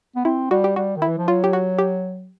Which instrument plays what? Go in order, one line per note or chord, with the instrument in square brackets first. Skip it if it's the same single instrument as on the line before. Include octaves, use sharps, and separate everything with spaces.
[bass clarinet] B3
[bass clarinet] C4 [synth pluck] E4
[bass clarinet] G3 [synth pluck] F#4
[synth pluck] G4
[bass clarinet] G3 [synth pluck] F#4
[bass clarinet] D#3
[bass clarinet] E3 [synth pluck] E4
[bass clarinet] F3
[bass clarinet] F#3 [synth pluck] F4
[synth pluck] G4
F#4
G4